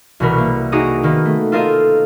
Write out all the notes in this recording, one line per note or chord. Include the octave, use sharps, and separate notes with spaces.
C2 B2 E3 F#4 A#4 B5
A#3
D#4 F#4 G#4 A#5 D6 D#6
D#3 A#3 B3
A3
F4 A4 A#4 C5 D#5 F5